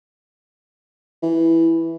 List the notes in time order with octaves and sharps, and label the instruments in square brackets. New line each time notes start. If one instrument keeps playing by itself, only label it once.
[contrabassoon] E3